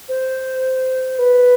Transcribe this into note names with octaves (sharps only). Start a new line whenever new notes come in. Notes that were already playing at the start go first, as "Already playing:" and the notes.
C5
B4